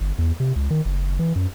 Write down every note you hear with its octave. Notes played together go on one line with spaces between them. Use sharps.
G1
E2
C3
C#2
D#3
F#1
E3
F#2